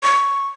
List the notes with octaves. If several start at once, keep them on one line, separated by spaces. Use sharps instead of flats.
C#6